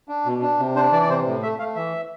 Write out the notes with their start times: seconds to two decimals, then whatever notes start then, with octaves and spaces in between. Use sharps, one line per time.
0.09 D4
0.26 B2
0.42 D4
0.59 C3
0.76 D4 C5
0.92 E3 D5
1.02 D5
1.09 C3 C5
1.26 A2
1.43 A3 E5
1.59 A3 F5
1.76 E3 E5